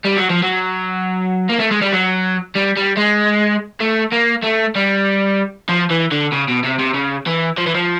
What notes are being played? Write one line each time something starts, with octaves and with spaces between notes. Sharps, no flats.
G3
F#3
F3
F#3
A#3
A3
G#3
G3
F#3
G3
G3
G#3
A3
A#3
A3
G3
F3
E3
D3
C#3
B2
C3
C3
C#3
E3
F3
E3
F3